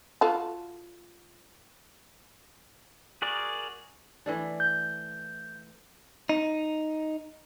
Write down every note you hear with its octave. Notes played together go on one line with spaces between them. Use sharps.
F4 F#4 A4
F#4 G#4 A#4 D5
E3 A3 D4
G6
D#4